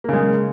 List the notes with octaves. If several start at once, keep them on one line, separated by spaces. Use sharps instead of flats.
C#3 G#3 A#3